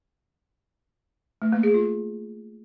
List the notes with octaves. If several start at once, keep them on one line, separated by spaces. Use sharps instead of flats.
A3
A#3
G#4
F4